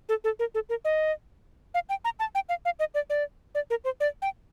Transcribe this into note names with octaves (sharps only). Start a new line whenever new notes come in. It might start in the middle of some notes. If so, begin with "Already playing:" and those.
A4
A4
A#4
A4
A#4
D#5
F5
G5
A#5
A5
G5
F5
F5
D#5
D5
D5
D5
A#4
C5
D5
G5